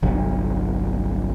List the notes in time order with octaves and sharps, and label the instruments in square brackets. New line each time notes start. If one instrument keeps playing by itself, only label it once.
[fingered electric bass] G1 C2 F#3